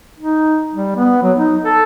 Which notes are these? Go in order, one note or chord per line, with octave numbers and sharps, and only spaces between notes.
D#4
G3
B3
F#3
D#4
A4